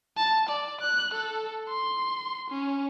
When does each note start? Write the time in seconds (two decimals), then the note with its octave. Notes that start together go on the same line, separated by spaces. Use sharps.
0.17 A5
0.49 D5
0.81 F#6
1.14 A4
1.69 C6
2.50 C#4